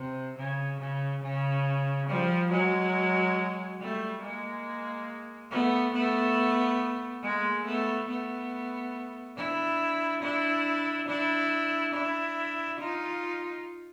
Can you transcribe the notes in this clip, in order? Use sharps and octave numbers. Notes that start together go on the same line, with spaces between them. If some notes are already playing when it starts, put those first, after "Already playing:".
Already playing: C3
C#3
C#3
C#3
F3 G3
F#3 G#3
G3 A3
G#3 A#3
A3 B3
A3 B3
G#3 A#3
A3 B3
A3 B3
D4 E4
D4 E4
D4 E4
D4 E4
D#4 F4